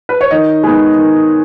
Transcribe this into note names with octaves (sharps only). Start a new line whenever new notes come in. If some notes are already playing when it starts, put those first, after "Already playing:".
B4
C#5
D#3 D#5
G#3 B3 D#4
D#3